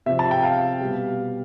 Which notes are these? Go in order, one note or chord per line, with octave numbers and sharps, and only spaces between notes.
C3 F3 E5
A5
G5
F5
B2 G3